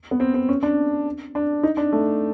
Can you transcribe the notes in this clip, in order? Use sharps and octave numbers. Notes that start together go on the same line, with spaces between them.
B3
C4
C4
C#4
D4
D4
D#4
D4
A3